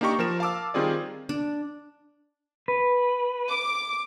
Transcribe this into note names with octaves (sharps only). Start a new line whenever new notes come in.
A#3 D4 D#4 G4 A#5 C#6
F3 A#4 E7
F5 A5 D6 E6
D#3 G3 C4 F4 G#4 D5
D4
B4
D6